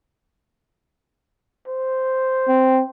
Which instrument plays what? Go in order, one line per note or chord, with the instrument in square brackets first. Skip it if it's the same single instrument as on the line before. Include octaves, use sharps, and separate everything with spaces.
[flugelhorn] C5
[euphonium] C4